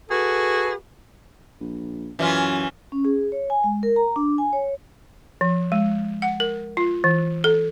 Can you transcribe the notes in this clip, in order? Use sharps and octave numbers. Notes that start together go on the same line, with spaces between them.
F#4 G#4 A4 B4
A#1
F#2 E3 C#4 F4
C#4
G#4
C#5
G#5
G#3
A#4
A#5
D4
G#5
C#5
F3
G#3
F#5
A#4
F4
E3
A4